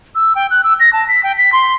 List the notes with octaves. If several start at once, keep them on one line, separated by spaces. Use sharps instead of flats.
E6
G5
F#6
E6
A#6
A5
B6
G5
B6
C6